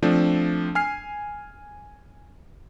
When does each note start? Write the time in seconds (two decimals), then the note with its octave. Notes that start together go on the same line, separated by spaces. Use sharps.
0.03 F3 A3 C4 D4
0.75 G#5 F6 C7